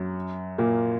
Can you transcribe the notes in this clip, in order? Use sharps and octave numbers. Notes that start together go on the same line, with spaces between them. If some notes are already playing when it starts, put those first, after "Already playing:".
Already playing: F#2 F#3
A#2 A#3